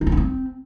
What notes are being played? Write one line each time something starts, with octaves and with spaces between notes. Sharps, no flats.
D#4
C4
D4
C4